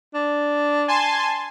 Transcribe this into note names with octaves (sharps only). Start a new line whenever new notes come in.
D4
G#5 A5 C6